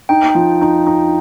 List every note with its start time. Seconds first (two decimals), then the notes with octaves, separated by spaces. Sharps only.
0.09 D#4 G5
0.35 F3
0.61 D#4
0.87 D#4